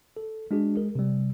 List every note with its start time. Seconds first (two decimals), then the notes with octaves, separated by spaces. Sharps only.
0.17 A4
0.51 G#3 D4 F#4 G#4
0.75 G#3 G#4 A#4
0.95 C3 G3